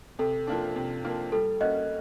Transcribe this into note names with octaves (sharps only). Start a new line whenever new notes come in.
C3 A4
F3 A#3 D4
C3
F3 A#3 D4
G3 A4
A#3 C#4 F#4 D#5